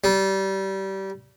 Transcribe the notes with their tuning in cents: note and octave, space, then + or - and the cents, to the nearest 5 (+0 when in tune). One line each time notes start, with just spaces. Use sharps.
G3 -25